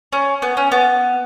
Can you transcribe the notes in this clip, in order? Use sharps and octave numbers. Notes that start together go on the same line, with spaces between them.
C#4
B3
C#4
B3